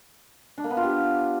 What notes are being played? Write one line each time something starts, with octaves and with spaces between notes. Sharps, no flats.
D4
A#3
B3
F4
G4